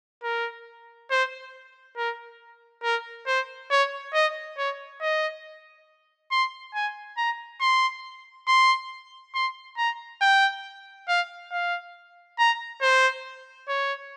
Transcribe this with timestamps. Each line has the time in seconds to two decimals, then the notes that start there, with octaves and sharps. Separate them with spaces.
0.23 A#4
1.10 C5
1.97 A#4
2.83 A#4
3.27 C5
3.71 C#5
4.14 D#5
4.58 C#5
5.01 D#5
6.31 C6
6.74 G#5
7.17 A#5
7.61 C6
8.48 C6
9.34 C6
9.78 A#5
10.21 G5
11.08 F5
11.52 F5
12.39 A#5
12.82 C5
13.68 C#5